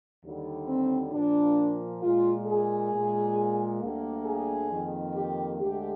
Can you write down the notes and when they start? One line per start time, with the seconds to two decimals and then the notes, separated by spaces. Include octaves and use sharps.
0.23 D#2 D3 G3
0.68 C4
1.12 A#2 F3 A#3 D4
2.02 A#2 G#3 F4
2.47 G#4
2.91 A#2 G#3
3.81 D2 D3 G3 A#3
4.25 G#4
4.70 F2 D#3 A#3
5.14 G4
5.59 D2 D3 G#3 G4